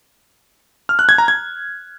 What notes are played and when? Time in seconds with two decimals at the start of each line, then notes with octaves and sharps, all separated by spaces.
0.89 F6
0.99 F#6
1.09 G#6
1.18 A#5
1.28 G#6